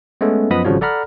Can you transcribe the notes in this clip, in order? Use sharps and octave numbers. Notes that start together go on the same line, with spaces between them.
G#3 A3 B3 C#4 A4
F#2 F3 B3 D#5 B5 D#6
G#1 C#3 F3 G3 F#4 C#5
A4 D5 F#5 A#5 B5 F6